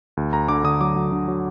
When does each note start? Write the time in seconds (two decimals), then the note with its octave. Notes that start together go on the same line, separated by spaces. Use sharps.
0.17 D2
0.33 D2 A#5
0.48 D3 D6
0.64 D3 D#6
0.80 F#3 D6
0.96 F#3
1.12 D3
1.28 F#3